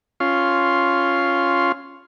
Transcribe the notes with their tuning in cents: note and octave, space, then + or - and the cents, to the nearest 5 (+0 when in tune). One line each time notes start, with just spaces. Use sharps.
C#4 +0 F4 +0 C6 +0